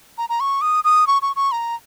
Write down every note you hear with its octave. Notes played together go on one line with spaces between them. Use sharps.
A#5
A#5
C#6
D#6
D#6
C#6
C#6
C#6
A#5